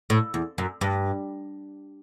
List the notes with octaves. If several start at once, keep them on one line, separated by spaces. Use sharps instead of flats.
A2
E2
F#2
G2